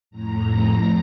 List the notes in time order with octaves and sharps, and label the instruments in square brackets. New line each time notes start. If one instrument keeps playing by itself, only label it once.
[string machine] F2 A2 A#5